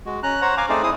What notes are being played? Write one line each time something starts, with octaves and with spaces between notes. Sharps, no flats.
G#3 F#4
C#4 A#5 F#6
C5 C#5 F#5 A#5
F5 G#5 A#5 D6
A3 C4 D#4 G#4 C5 D5
E4 G#4 C5 D#6